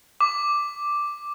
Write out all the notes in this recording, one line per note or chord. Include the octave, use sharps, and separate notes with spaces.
D6